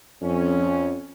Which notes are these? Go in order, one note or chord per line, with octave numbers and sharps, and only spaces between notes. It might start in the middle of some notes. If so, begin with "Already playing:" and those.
F2 C#4